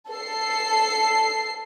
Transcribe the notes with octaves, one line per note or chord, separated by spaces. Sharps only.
A4 C7